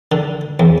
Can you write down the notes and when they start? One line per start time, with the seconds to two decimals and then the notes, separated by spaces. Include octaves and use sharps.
0.12 D3
0.60 E2